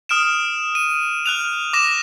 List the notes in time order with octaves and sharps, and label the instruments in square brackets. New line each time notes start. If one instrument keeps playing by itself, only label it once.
[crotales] D#6 F6 D7 E7
D#7
F6 F#6 F7
D6 A#6 E7